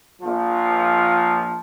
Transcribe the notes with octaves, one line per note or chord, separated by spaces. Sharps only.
A#1 F3 F4